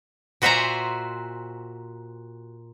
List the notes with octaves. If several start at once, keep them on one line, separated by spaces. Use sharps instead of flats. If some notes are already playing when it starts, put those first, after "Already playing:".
A#2 F#4 C5 E5 G#5 A#5